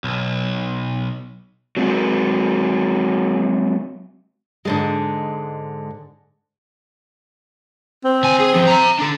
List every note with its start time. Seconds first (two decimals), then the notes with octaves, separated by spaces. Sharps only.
0.04 B1
1.77 F#3 G#3 C4 F#4
4.65 G#2 D3 G#3
8.04 C4
8.23 D2 G#5
8.40 G#4
8.54 F3 B3
8.67 E5 A#5
8.99 D4 A4